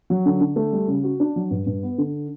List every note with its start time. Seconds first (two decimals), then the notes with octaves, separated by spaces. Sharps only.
0.10 F#3
0.26 D3
0.41 D3
0.56 A3
0.73 G3
0.88 C#3
1.04 F#4
1.20 D4
1.36 F#3
1.51 G2
1.67 G2
1.83 B3
1.98 D3